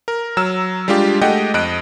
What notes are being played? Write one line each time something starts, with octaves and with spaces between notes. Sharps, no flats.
A#4
F#3 A#5 E6 F6 E7
G3 G#3 D4 F4 G4
G#3 A3 G4 D#5 F#5 G5
F2 D#5 F#6 D7